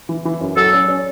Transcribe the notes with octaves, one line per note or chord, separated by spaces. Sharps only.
E3
E3
F#2
F#3 A4
C#4
C#4